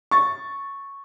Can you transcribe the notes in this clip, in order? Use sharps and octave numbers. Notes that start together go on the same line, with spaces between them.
C#6 A6